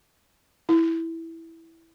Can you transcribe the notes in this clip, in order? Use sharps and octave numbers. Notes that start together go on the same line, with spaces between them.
E4